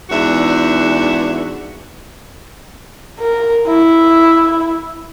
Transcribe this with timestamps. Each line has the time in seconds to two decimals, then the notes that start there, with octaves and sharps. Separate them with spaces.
0.10 E2 G#2 D4 F#4 E5
3.20 A#4
3.67 E4